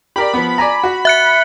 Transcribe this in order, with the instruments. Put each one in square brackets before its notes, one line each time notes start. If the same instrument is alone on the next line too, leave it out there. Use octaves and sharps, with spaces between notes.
[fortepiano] G4 A#4 D5 [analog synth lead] B5
[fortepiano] F3 B3
D5 G#5 A#5
F#4
[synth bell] E5 F#6 C#7